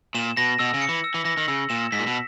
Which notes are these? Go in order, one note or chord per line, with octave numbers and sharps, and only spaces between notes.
A#2 E7
B2 A#6
B2 E6
C#3
C#7
E3
E6
E3
E3 A#6
D#3
C#3 E6
A#2 E7
G#2 B6
A#2
B2